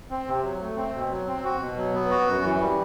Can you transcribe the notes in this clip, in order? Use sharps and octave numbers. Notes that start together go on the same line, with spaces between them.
C4
C3
F#3
A3
C4
B2
F#3
C4
F#4
B2
F#3
B3
F#4
F#2
E3
G3